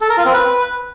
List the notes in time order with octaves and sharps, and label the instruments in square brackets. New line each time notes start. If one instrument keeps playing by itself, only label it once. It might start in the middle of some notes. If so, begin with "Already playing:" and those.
[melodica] A4
A#4
F4
C4
B4